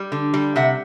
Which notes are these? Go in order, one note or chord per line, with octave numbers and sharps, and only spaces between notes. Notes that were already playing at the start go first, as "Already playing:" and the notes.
Already playing: G3
D3
G3
C3 E5 F#5